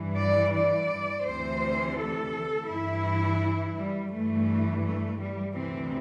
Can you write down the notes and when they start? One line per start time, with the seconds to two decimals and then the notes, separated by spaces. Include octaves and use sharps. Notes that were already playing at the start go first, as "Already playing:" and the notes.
Already playing: G2 E3
0.18 D5
0.53 D5
1.25 D2 C3 E3 C5
1.97 A4
2.68 G2 E3 E4
3.76 G3
4.12 G2 E3 A3
4.84 A3
5.19 G3
5.55 D2 C3 E3 C4